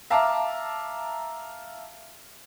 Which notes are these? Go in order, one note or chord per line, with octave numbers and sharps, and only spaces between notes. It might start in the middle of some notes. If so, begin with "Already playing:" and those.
E5 F5 A5 A#5 D6